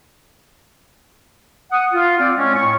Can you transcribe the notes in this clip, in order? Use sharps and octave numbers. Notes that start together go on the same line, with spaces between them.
F#5 D#6
F4
C4 D5
G#3 C4 C#4
A2 C#6